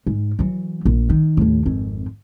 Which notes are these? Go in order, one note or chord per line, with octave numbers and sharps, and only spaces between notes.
G#2
E3 F#3
A#1
D#3
D#2 A2
G#1 F2